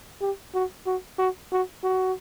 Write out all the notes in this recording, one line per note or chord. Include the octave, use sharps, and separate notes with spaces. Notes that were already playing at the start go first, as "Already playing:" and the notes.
G4
F#4
F#4
F#4
F#4
F#4